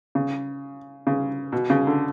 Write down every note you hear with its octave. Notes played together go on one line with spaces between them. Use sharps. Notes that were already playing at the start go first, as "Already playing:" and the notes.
C#3
C#3
B2
C#3
D3